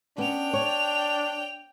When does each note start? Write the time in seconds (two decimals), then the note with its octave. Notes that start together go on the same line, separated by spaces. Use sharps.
0.18 B3 C#4 D4 G5 F7
0.53 C#5